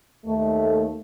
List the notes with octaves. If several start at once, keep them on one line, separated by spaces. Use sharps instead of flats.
D#2 A3